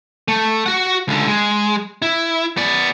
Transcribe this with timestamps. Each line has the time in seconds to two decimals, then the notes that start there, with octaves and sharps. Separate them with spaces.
0.28 A3
0.66 F#4 F#5
1.08 C#2 D3
1.27 G#3
2.02 E4
2.57 B3 D5